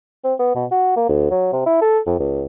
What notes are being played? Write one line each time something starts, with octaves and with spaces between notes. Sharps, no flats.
C4
B3
B2
F#4
A#3
D2
F#3
C3
E4
A4
F2
C#2